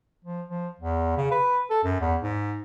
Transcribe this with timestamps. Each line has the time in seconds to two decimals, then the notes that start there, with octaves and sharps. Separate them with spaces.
0.25 F3
0.48 F3
0.81 E2
1.17 C#3
1.31 B4
1.70 A4
1.84 F#2
2.00 E2
2.21 G#2